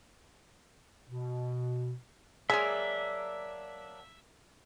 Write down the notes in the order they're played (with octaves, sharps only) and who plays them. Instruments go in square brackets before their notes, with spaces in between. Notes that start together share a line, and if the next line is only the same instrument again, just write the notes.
[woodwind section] B2
[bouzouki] F#3 A#3 D4 [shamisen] G#3 G#4 [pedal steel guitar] E5